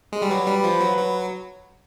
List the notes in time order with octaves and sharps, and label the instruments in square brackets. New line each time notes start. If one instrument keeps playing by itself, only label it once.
[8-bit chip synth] G#3
G3
[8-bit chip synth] F#3 [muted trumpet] B4
[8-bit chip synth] G3
F3
F#3
F#3